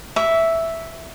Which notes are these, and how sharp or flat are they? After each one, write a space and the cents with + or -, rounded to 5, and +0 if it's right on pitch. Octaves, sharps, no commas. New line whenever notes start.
E5 +0 C#6 +45